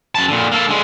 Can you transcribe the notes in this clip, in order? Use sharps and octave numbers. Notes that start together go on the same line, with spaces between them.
F#2 A5
A#2 D3
A#3 A4
D3 G#3